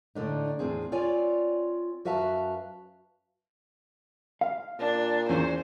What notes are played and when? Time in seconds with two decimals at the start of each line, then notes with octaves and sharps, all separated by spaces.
0.15 A2 D3 D4 D#4
0.59 E2 A2 C#3 C4 G#4
0.92 C4 F4 C#5 D5 G#5
2.05 F#2 F#4 B4 E5 F5 A5
4.41 F5
4.79 A#2 D4
5.29 E2 C#4 C5